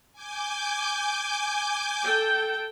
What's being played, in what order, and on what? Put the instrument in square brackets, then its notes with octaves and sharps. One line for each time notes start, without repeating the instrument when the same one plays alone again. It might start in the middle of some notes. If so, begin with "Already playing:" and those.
[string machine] G#5 D6 G6
[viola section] A4 G5